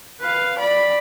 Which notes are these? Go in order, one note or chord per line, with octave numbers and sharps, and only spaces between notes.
B4 F5
D5 B5